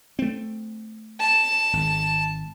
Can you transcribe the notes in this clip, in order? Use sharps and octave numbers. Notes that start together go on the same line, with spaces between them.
A3 C4
A5
G#1